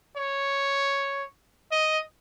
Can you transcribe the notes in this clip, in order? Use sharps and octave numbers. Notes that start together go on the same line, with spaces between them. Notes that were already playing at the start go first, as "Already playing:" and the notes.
C#5
D#5